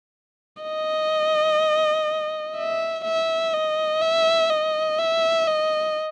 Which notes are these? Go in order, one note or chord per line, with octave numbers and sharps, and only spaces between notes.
D#5
E5
E5
D#5
E5
D#5
E5
D#5